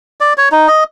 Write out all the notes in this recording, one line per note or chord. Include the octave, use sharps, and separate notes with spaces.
D5
C#5
D#4
D#5